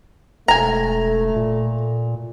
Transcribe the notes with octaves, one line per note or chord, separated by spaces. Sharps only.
E1 A3 G#5 A#5
A#2